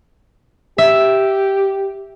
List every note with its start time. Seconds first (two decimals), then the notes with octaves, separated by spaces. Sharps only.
0.78 G4 E5